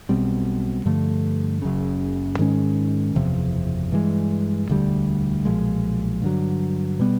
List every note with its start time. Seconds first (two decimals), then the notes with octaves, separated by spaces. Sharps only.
0.09 B1 B2 G3 C4
0.85 G2 D3 F3 A3
1.62 F#1 F#2 C#3
2.39 G#2 D#3 G#3 C#4
3.15 F#1 E2 C3 F3
3.92 G2 E3 G#3
4.69 E1 D2 D3 G3
5.45 B1 A#2 F3 G#3
6.22 G2 D3 F#3
6.99 B2 G3 B3